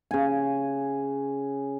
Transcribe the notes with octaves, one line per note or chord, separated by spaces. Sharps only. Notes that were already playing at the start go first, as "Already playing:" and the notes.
C#3 G#5